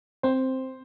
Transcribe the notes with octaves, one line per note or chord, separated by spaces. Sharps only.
C4 C5